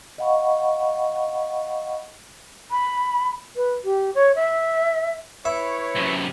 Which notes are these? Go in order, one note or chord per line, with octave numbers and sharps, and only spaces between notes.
D#5 F5 F#5 B5 C#6
B5
B4
G4
C#5
E5
E4 B4 C#5 E5
F#2 C3